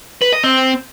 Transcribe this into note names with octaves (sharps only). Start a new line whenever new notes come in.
B4
D#5
C4